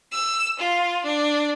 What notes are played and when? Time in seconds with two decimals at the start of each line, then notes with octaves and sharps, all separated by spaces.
0.13 E6
0.59 F4
1.04 D4